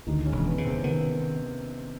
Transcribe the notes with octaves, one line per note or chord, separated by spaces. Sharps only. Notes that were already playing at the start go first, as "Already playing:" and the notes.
D2 D#3 D#4
C#3 C#4
E1
B3
C#3
C3 C4
D#3 B3